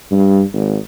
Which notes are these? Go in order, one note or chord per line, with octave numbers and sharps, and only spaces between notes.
G2
G#1